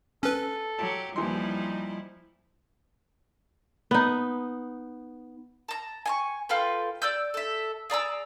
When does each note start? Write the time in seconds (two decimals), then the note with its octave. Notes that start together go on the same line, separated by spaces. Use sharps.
0.23 C#4 A4 B4
0.79 F#3 G4 A5
1.16 D#2 E3 F3 G3 D#4 E4 C6
3.91 B3 D#4
5.68 A5 A#5
6.05 G#5 A5 C#6
6.49 F4 A4 B4 G5
7.02 D5 E6 G6
7.34 A4 E5
7.90 G#4 D5 A#5 E6